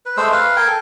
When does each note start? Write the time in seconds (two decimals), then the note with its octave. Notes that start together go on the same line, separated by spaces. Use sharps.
0.06 B4
0.17 G#3 A3 C5 E6
0.32 B4 F5
0.56 A#4 G5 G#5
0.67 A4